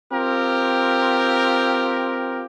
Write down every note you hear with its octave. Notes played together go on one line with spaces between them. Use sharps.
C4 F4 G4 A#4